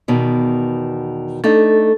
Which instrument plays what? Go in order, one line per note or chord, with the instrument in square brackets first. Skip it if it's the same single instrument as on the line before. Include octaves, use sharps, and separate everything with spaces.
[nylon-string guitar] E2 B2 D#3
[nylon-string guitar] A3 D4 D#4 [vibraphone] A4